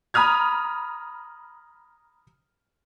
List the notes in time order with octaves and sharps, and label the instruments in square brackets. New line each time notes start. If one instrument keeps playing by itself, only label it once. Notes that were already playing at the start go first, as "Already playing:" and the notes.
[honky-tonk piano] A#5 B5 D#6 F6 G#6